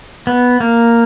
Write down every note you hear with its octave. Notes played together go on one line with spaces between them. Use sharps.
B3
A#3